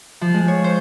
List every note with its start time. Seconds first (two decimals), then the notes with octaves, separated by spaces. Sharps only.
0.21 F3
0.34 G#3
0.48 C#5
0.64 C5